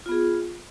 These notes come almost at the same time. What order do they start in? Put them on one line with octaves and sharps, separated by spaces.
F4 B3 G#4